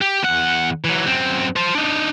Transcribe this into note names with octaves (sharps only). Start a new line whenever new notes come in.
G4
E2 F#5
E3 F#3
F#2 C4
C5 A5
D4 D#4